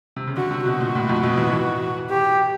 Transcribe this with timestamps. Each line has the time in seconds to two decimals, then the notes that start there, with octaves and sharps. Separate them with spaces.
0.16 C3
0.27 C#3
0.37 D3 F#4
0.51 C3
0.65 B2 F#4
0.80 A#2
0.95 A2
1.09 F2
1.23 B2
1.37 E3
1.52 E3
2.10 G4